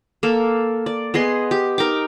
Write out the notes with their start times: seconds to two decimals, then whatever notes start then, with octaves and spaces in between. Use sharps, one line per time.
0.23 A#3 A4
0.86 D5
1.14 B3 G#4 D#5 C6
1.51 G4
1.78 D#4 A#4 G5 D6